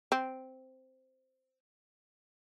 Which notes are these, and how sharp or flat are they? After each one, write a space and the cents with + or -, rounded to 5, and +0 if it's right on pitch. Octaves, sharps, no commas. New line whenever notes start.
C4 -5